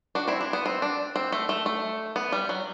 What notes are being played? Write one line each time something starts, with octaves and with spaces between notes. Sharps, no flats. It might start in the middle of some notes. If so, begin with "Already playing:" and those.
D4 F#4
C4 E4
D4
B3
C4
D4
C4
A3
A3
A3
B3
G3
F#3